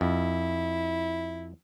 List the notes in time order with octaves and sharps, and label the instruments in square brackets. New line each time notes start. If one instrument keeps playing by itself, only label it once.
[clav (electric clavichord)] F2 [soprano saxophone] E4